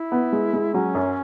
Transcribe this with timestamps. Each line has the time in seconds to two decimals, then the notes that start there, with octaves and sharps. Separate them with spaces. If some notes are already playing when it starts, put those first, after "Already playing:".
Already playing: E4
0.12 B3
0.33 G#3
0.53 G#3
0.74 F#3 C#4
0.95 F#2